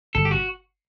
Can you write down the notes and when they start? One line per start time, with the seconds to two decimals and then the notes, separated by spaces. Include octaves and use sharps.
0.15 G1 A4
0.25 G4
0.31 F#4